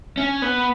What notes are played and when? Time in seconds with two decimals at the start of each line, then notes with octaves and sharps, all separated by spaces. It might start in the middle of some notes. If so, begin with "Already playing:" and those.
0.17 C#4
0.42 B3